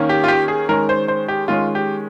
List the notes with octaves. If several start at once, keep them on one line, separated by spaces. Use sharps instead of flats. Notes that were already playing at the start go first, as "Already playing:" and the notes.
Already playing: D#3 A#3 C#4
G4
F4
G4
G#4
D#3 G#3 C#4 A#4
C5
C5
G4
D#3 G#3 C#4 F4
G4